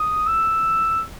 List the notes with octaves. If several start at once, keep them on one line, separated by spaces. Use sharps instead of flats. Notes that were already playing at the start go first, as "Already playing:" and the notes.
Already playing: D#6
E6